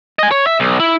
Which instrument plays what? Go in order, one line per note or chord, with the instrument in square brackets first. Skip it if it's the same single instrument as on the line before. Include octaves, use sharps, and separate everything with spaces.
[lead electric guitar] D#5 G#5
C#5
E5
B1
E4